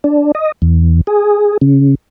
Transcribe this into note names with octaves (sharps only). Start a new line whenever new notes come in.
D4
D#5
E2
G#4
C#3